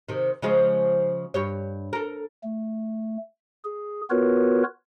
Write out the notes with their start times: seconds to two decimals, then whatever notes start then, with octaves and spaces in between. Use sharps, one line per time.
0.09 C3 D#3
0.42 C#3 F3 G#3
1.34 G2 G4 C#5
1.93 A4 A#4
2.43 A3
3.64 G#4
4.10 B3 F4 F#4 A#4 B4 C#5